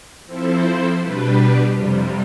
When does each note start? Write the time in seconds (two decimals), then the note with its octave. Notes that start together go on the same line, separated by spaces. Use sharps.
0.26 F3 C4 E4 A4 C5
1.00 B2 G3 D4 G4 B4
1.73 F2 C3 G3